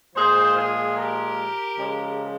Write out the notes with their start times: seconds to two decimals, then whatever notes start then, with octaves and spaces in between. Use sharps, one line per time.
0.16 A#2 F3 G#3 G#4 C5
0.56 F4 G#4
0.96 G4 A#4
1.78 C#3 F3 G#3